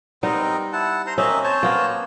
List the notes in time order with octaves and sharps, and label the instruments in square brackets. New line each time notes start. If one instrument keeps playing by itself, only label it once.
[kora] G3 B3 D#4 [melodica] C4 A#4 D#5
[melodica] E4 F#5 A5
C5 A#5 C6
[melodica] A#3 D#5 E5 [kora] C4 C#4
[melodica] C5 C#5 A5
[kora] A#3 B3